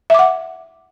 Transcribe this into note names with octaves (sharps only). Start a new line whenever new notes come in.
E5 F#5 D6